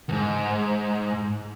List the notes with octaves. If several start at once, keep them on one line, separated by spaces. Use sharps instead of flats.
D#2 G#2